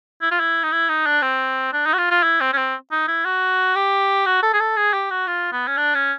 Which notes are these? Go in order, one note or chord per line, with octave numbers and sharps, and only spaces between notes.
E4
F4
E4
D#4
E4
D#4
D4
C4
D4
D#4
F#4
F4
F4
E4
C4
C#4
C4
D#4
E4
F#4
G4
F#4
A4
G#4
A4
G#4
G4
F#4
F4
B3
C#4
D4
C#4